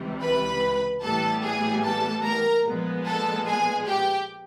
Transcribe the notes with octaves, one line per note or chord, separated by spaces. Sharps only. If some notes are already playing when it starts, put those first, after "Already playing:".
Already playing: C#2 C3 E3 G3
B4 B5
A2 E3 G3 B3 A4 A5
G#4 G#5
A4 A5
A#4 A#5
A#2 F3 G#3 B3
A4 A5
G#4 G#5
G4 G5